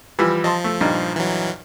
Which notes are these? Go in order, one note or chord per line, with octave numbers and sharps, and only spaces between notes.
E3 F3 G3
F3 D#5 A5 C6
A3
G2 A#2 D#4
E3 F#3